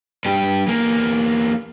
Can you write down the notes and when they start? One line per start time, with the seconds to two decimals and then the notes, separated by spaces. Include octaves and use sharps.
0.25 G2 G4
0.67 E2 A#3